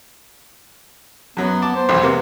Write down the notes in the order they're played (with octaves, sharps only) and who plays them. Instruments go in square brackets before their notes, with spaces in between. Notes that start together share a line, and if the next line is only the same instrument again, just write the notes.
[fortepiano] F#2 F#3 [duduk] B3
[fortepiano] A5 D6
[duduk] C5
[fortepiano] B1 E2
C3 A#3 B3